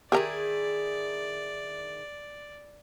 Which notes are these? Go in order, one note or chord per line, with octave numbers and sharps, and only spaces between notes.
D#3 E4 G4 G#4 A#4 D5 A#5